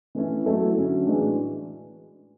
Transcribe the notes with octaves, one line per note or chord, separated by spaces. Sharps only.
E3 A3 C#4 E4
F#3 A3 E4 A4
D3 F#3 C#4
A2 E3 G#3 D4 F#4